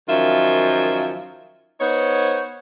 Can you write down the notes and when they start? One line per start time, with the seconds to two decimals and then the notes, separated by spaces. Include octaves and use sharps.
0.09 F#2 D#3 F3 F4 E5
1.81 B3 D#4 C5 C#5